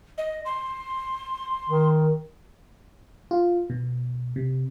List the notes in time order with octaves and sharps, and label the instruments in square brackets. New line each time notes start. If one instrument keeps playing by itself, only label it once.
[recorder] D#5
C6
[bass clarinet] D#3
[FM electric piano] F4
B2
C3